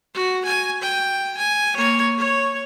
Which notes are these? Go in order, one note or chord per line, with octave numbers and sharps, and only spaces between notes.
F#4
G#5
G5
G#5
A#3 C#5
C#5